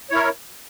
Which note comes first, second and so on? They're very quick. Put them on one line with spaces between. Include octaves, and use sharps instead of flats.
C#5 E4 A#4